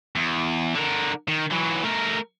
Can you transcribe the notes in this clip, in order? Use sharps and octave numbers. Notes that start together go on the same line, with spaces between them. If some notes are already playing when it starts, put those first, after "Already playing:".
E2
D3 A#4
D#3
E3 F#3
A3 A#4